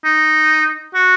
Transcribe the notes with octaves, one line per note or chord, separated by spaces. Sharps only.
D#4
F#4